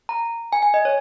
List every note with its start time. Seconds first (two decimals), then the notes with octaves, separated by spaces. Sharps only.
0.09 A#5
0.53 G#5
0.63 G#5
0.74 D#5
0.85 C#5